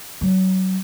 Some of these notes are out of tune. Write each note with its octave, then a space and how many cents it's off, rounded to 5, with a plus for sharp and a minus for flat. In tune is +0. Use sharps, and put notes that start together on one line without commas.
F#3 +25